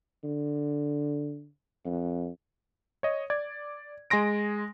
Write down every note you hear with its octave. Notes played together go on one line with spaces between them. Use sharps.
D3
F2
C#5 D#5
D5 G#6
G#3 G#5 C6 A#6 D7